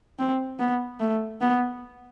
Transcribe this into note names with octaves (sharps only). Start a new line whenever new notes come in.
C4
B3
A3
B3